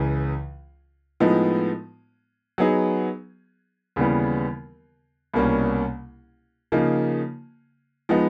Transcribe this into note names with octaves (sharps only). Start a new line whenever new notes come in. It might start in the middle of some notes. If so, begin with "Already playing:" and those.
Already playing: C#2 C#3 E3
A2 F3 G#3 B3 D#4
F#3 B3 D#4 G#4
D#2 C#3 E3 G3 B3
C2 B2 G3 A#3 C#4
C#3 F3 A#3 D#4
F3 G#3 B3 D#4